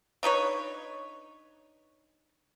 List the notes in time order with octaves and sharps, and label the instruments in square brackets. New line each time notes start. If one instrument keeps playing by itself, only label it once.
[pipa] D4 D#4 B4 C#5